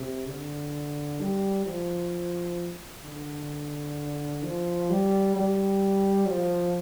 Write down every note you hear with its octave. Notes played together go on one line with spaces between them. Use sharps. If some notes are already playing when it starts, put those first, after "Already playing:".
Already playing: C3
D3
G3
F3
D3
F3
G3
G3
F3